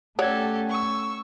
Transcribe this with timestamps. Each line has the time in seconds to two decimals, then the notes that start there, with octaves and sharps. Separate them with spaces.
0.19 A3 C#4 G4 A4 C#5 D5 F#5 G#6
0.69 C#6 E6